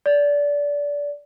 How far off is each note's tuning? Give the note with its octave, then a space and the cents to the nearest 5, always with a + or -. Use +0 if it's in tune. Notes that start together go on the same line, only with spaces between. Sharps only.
D5 -20